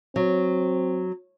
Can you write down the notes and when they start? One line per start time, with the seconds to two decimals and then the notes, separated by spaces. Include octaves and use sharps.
0.16 F#3 C4